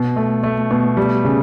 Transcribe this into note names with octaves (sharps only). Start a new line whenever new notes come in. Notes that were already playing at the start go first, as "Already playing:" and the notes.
Already playing: B2
A3
A3
B2
G3
C#3